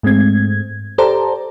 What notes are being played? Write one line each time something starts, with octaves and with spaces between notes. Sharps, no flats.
G#2 G#3 A3 C4 G#6
G4 A4 C5 D5 A5 A#5